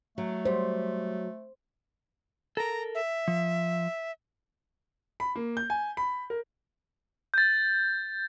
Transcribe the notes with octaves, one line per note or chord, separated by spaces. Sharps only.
F#3 A3
F#3 G3 C5
A4 A#4 A#5
E5
F3
B5
A#3
G6
G#5
B5
A#4
G6 A6